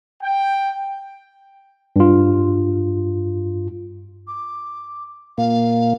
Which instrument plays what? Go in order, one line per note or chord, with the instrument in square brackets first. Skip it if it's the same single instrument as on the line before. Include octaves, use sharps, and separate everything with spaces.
[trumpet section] G5
[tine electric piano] G2 F4
[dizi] D6
[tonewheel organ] A#2 A#3 [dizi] F5